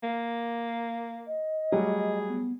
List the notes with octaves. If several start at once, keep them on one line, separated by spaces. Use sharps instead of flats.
A#3
D#5
F#3 G3 A3 G#4
B3